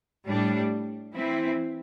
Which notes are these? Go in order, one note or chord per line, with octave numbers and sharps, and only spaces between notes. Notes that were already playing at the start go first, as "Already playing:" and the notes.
A2 G3 D4
E3 C4 E4